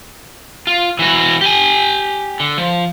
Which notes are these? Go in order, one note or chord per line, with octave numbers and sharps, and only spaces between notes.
F4
E3 F#4
G4 G#5
D3
F3